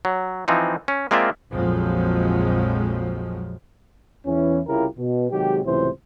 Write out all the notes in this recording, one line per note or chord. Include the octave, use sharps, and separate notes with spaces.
F#3
E3 F3 C4 D#4
C#4
G#3 A#3 C4 F4 D5 E5
A#1 F2 F3 F#3 G#3
E2 E3 C#4
C2 C#3 E4 F4 G4 A#4
B2
C3 D#3 F#3 G#3 G4
C#2 A2 C3 E3 F#3 C5